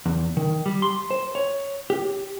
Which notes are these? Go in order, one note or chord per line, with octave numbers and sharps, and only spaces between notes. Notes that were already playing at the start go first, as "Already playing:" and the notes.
E2
D#3
G3
C6
C5
C#5
G4